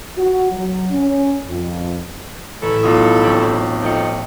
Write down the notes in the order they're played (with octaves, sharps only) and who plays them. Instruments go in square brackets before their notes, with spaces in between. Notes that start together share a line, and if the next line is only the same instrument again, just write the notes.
[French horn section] F#4
F#3
C#4
F2
[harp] A1 [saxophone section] E4 A4
[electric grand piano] B1 F4 D#6
[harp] C4 C#4 G4
[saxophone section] F3 A3 D#4 [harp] G5 C#7